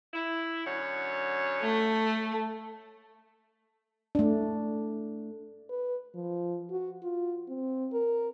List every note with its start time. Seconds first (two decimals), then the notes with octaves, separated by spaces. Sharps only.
0.13 E4
0.65 F#2 D3 C#5
1.61 A3
4.15 A3 D4
5.69 B4
6.15 F3
6.70 F#4
7.03 F4
7.48 C4
7.93 A#4